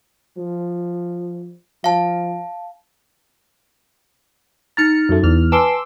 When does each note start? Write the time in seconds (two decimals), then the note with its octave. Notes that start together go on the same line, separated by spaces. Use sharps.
0.37 F3
1.84 F3 F5 A5
4.77 D#4 A#5 F6 A6 C#7
5.09 F#2 A3
5.23 E2 F6
5.52 B4 G#5 A5 C6 D6 E6